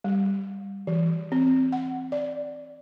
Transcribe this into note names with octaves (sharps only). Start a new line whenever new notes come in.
G3
E3
C4
F#5
D5